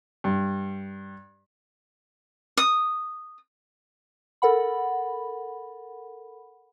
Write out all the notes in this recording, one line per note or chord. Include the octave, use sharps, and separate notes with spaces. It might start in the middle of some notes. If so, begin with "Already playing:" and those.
G2
D#6
A4 A#4 F#5 B5